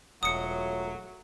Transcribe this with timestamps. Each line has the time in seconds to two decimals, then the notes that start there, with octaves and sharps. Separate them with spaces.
0.23 E1 F#3 A3 F4 C#5 D#6 C#7